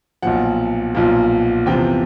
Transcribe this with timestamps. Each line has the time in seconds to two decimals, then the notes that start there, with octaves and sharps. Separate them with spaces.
0.22 B1 A#2 F3 F#5
0.95 B1 A#2 F3
1.66 E2 C3 F3 G5